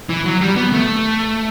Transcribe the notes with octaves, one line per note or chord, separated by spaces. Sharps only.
E3
F#3
G3
B3
A3